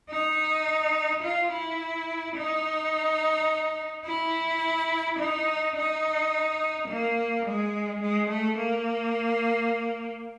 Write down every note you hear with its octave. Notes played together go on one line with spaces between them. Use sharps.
D#4
F4
E4
D#4
E4
D#4
D#4
A#3
G#3
G#3
A3
A#3